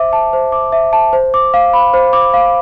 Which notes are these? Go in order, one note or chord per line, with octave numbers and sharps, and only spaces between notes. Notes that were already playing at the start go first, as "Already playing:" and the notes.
Already playing: C5 E5 D6
A5
C5
D6
E5
A5
C5
D6
F5
B5
C5
D6
F5